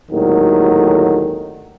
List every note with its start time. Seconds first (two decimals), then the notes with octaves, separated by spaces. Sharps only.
0.11 G#1 D#2 A2 D3 D#3 F#3